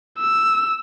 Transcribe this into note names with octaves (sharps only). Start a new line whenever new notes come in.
E6